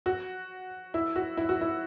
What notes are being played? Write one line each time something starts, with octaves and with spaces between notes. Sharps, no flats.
F#4
E4
F#4
E4
F#4
E4